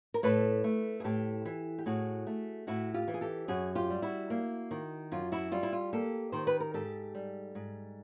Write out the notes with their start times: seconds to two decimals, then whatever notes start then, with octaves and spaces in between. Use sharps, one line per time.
0.14 A#4
0.23 A2 A4 B4
0.64 A3
1.00 G#4
1.04 A2 G4 A4
1.45 E3
1.78 G4
1.86 A2 F#4 G#4
2.27 A3
2.67 A2 E4 F#4
2.94 F4 G4
3.08 E3
3.14 G#4
3.21 G4 A4
3.48 F#2 F#4 G#4
3.76 F4 G4
3.90 G3
4.02 E4 F#4
4.30 A#3
4.71 D#3
5.12 F#2 F4
5.32 E4 F#4
5.52 G3 F4
5.63 E4
5.73 F4
5.93 A#3 G4 A4
6.32 D#3 C5
6.47 B4
6.60 A#4
6.74 G#2 G4 A4
7.15 G3
7.55 G#2